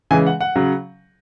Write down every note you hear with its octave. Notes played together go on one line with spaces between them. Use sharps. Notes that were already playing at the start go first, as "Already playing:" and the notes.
C#3 E3 G#3 G#5
F#5
F#5
C#3 F#3